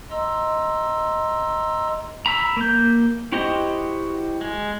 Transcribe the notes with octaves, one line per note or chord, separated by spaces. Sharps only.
D#5 A#5 C6 E6
A#5 B5 E6
A#3 G6
E4 F#4 G4 C5 D#5
G#3